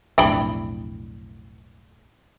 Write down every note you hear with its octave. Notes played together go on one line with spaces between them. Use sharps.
B1 F2 A2 D4 G5 B5